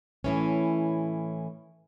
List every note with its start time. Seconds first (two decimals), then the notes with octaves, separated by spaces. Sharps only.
0.24 A2 E3 C#4